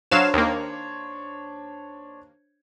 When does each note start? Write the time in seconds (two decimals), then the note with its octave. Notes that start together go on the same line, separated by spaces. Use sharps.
0.11 F#3 D4 C5 C#5 F5 E7
0.34 D#2 A#3